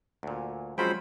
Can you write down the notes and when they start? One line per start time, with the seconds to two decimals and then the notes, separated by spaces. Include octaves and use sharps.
0.23 D2 A#2
0.78 F3 F#3 G#3 C4 C#4 C5 G5 B5